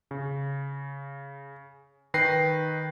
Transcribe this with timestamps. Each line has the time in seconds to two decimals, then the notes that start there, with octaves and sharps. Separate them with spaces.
0.11 C#3
2.14 D#3 B4 G5 A#6 C7